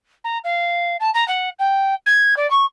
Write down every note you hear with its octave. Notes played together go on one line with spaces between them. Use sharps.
A#5
F5
A5
A#5
F#5
G5
G#6
D5
C#6